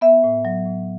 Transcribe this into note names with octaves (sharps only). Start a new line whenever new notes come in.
B3 E5
A2
F#3
A2